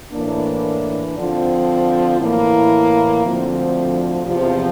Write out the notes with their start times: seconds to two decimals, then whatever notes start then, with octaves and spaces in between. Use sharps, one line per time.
0.12 A2 E3 A#3 D4
1.16 D3 F3 C4
2.19 A2 E3 A#3 E4
3.22 D2 D3 F3 C4
4.26 E2 C3 F3